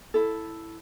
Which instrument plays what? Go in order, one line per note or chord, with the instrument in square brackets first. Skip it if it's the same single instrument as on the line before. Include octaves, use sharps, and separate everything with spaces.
[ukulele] E4 A4